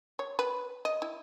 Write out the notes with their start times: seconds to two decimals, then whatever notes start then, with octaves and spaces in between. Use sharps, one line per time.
0.19 C#5
0.39 B4
0.85 D#5
1.02 E4